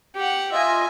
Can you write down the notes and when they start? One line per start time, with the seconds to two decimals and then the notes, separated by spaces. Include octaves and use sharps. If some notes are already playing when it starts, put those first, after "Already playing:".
0.16 G4 F#5
0.52 F4 D#5 E5 G#5